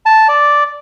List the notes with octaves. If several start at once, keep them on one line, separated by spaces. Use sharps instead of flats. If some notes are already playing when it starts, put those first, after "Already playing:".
A5
D5